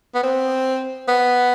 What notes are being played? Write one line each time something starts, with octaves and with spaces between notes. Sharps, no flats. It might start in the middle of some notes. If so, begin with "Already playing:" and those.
B3
C4
B3